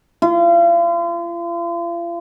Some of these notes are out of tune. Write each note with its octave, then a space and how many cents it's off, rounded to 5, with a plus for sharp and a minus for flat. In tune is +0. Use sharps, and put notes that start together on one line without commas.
F4 -40